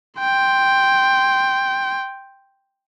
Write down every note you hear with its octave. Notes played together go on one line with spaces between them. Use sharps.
G5 C6